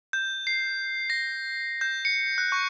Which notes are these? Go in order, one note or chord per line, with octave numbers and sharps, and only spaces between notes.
G6
C7
A#6
G6
C#7
F#6
C#6